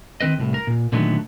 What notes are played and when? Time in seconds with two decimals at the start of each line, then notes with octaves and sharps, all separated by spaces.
0.21 D#3 C4 B4 D#5
0.38 C2 A2
0.54 A#4
0.67 A#2
0.92 A#2 D3 D#3 F#3 A3 B3